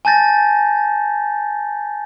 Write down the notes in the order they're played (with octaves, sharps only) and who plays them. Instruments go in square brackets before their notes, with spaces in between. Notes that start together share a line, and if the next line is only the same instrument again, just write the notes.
[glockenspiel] G#5 A5 G6 A6 A#6